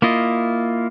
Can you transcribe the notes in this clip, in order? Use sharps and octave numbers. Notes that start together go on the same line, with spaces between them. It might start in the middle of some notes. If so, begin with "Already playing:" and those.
A#3 E4 F4 D#5